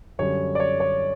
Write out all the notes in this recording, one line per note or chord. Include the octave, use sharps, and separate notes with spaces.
F#2 D3 G3 C#5
D5
C#5
C#5